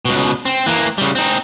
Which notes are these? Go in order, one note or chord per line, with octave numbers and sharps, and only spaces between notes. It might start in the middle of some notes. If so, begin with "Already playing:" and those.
C#2 B2
C4
E3 A#3
C#3 G3
C4 D#4